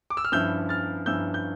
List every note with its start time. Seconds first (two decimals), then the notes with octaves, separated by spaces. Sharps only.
0.10 D6
0.17 E6
0.25 F6
0.32 G2 F3 C#4 E4 E6 G6
0.69 F6 A6
1.06 G2 F3 C#4 E4 E6 G6
1.34 G6